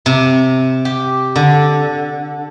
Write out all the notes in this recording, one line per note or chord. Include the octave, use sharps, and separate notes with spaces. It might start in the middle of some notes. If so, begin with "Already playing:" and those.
C3
G4
D3